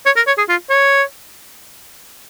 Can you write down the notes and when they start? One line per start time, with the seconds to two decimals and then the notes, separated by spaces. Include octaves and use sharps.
0.06 C#5
0.16 A#4
0.27 C#5
0.38 G#4
0.49 F4
0.70 C#5